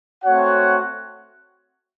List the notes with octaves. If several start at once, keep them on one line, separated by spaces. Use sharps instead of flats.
A3 C4 F#4 C#5 F#5